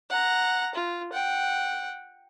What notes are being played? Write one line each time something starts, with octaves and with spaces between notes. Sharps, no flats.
F#5 A#5
F4
F#5 G5